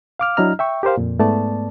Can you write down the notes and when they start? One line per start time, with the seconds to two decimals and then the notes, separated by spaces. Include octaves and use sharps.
0.19 F5 D6 F6
0.37 F#3 D4 E4 D#5 A#5 F6
0.59 E5 G5 C#6
0.83 G4 A#4 C5 F5
0.98 F2 A#2
1.19 G#2 A3 B3 D5 A5